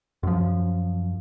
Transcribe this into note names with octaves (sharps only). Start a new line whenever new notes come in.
F#2 F3